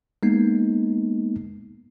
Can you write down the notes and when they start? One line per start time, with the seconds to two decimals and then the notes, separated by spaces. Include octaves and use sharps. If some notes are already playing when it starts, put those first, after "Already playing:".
0.23 G#3 A#3 B3 D#4